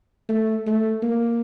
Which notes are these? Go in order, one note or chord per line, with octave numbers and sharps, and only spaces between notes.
A3
A3
A#3